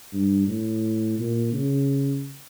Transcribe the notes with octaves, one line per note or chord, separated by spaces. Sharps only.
G2
A2
A#2
C#3